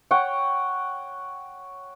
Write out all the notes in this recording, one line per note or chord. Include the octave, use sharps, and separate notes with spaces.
C#5 F#5 G5